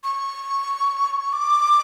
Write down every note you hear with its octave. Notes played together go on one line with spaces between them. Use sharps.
C#6
D6